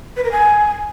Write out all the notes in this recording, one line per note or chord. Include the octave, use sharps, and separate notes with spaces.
B4
A#4
G#5